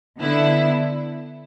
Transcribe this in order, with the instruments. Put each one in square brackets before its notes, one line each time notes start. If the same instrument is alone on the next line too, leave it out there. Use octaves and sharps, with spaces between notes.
[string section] D3 B3 E4